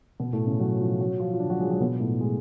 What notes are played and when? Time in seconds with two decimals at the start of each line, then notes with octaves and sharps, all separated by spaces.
0.20 B2 B3
0.33 A2 A3
0.47 C#3 C#4
0.60 F#3 F#4
0.80 F3 F4
1.00 F#3 F#4
1.20 F3 F4
1.34 F4
1.40 D3 D4
1.50 F#3 F#4
1.60 G#3 G#4
1.70 F#3 F#4
1.80 B2 B3
2.00 A2 A3
2.21 G#3